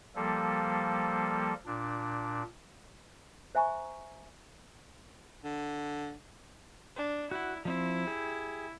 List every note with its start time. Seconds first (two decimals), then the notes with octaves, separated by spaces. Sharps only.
0.16 F3 G3 A#3 A4
1.66 A#2 D4
3.55 C5 E5 G#5 A#5 C#6
5.44 D3
6.96 D4
7.31 E4 F#4 F#5
7.65 F3 C4 E4
8.07 G4 G#4